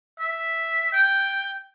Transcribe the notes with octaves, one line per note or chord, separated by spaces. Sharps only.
E5
G5